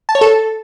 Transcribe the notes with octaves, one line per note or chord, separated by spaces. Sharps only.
A5
C#5
A4